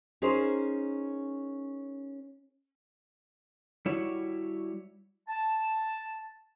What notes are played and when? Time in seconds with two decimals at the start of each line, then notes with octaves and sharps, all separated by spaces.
0.22 C#4 D#4 G#4 A#4 C5
3.86 G3 E4 F#4 C#5
5.28 A5